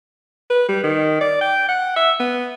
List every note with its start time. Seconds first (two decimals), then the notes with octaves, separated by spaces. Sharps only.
0.50 B4
0.68 G3
0.83 D#3
1.21 D5
1.41 G5
1.68 F#5
1.96 E5
2.20 B3